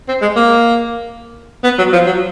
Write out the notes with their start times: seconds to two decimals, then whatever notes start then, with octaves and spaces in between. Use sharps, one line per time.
0.08 C4
0.22 G#3
0.36 A#3
1.64 B3
1.78 F#3
1.93 F3
2.07 F#3